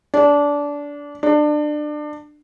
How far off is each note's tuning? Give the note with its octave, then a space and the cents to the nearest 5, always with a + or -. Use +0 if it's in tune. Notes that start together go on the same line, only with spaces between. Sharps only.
D4 -20
D4 +25